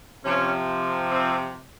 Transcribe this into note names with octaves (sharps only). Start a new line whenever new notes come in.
C3 F3 C#4
C4